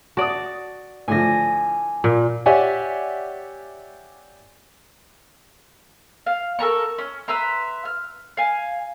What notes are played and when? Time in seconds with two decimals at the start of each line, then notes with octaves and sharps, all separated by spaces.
0.17 F#4 D5 A5 D#6
1.08 A2 D3 F3 G#5 A#6
2.04 A#2
2.46 G4 C#5 D5 E5 F#5 G#5
6.26 F5
6.59 A4 A#4 A#5 C#6
6.98 C#4
7.28 B4 E5 A#5 C6
7.85 F6
8.37 F5 G#5